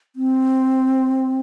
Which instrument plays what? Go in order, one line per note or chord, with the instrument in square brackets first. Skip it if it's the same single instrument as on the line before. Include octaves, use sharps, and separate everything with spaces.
[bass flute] C4